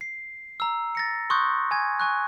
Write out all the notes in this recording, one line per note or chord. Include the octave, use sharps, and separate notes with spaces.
C7
A#5 E6
A6 A#6 C#7
C6 C#6 D#6 F#6 G6
G#5 G#6
G#5 C#6 F#6